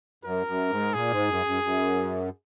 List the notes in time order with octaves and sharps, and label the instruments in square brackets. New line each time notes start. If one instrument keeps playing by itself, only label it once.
[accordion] F#2 [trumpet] A#4
[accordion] F#2
G#2
[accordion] A#2 [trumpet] G#4
[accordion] G#2
F#2
F#2
F#2